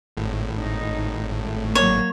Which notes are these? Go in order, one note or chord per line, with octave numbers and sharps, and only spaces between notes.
G#1 A2
D#4
A3
F#3 A#3 C#5